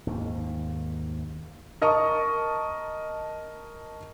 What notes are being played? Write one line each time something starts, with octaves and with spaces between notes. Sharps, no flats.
D#2 G#2 D#3
A#4 D#5 A5 C#6 D#6